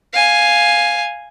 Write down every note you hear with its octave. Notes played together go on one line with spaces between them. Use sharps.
F5 G#5